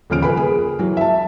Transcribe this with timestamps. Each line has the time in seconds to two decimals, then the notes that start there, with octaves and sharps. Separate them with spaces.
0.10 D#1 C#3 F3 F6 D7
0.22 A#4 B4 G#5 B5
0.37 G#4
0.79 E3 F#3
0.97 E5 A5